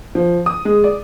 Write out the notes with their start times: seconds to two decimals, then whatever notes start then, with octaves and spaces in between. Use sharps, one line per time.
0.15 F3
0.46 D#6
0.65 G#3
0.84 D5